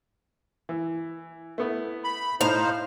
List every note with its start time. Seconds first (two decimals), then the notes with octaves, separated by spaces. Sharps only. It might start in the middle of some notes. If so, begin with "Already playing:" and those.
0.69 E3
1.58 A3 B3 E4
2.04 B5
2.41 A2 D#4 C5 F5